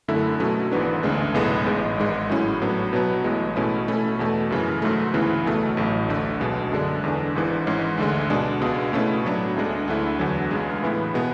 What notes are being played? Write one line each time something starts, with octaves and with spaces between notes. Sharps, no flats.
F#2 D3 A3 E4
B2 F#3 A3 C#4
G#1 G#2 E3 B3 D4
D2 C#3 G#3 D4
B1 A2 G#3 B3
A1 G#2 G#3
G#1 G#2 G#3
A2 F#3 C#4 E4
A2 F#3 B3 D4
B2 F#3 B3
A1 A2 G#3
B2 A3 C#4 E4
B2 A3 C#4 E4
E2 B2 A3
F#2 C#3 E3
G#2 F#3 A3
D2 C#3 E3 B3 E4
B1 B2 A3
A1 A2 F#3
D2 D3 A3
B1 B2 G#3
F#2 D3 G#3 D4
E2 D3 G#3 D4
G#1 G#2 E3
G#2 E3 G#3 C#4
D2 D3 G#3
B2 G#3 D4
C#2 B2 G#3
B2 A3 C#4 E4
A2 F#3 B3 D4
D2 D3 G#3 D4
D2 D3 A3 E4
E2 D3 F#3
C#2 C#3 G#3
A2 E3 B3 E4
B2 G#3 B3